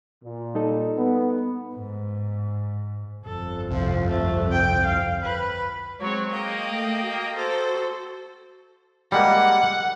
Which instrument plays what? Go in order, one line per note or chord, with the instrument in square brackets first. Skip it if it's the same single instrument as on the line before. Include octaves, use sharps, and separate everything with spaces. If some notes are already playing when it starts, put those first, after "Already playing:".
[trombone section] A#2
[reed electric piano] G3 D#4 A4
[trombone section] B3
[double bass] G#2
[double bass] G1 F2 [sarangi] A4
[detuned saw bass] C2 [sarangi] F3
[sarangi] A3
G5
F5
B4
[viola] F#3 C4 [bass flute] G#3 [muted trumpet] C#5
[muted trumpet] A#3 [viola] D#5 G5
[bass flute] A3
F#4
[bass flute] F#4 [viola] A4 C5
[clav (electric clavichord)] G3 G#3 A#3 [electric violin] F#5